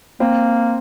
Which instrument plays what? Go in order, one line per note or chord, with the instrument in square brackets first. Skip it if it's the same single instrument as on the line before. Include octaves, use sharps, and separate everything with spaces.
[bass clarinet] A#3 [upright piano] C4